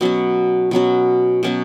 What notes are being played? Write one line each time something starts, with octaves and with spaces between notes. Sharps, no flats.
B2 F#3 C#4 F#4
B2 F#3 C#4 F#4
B2 F#3 C#4 F#4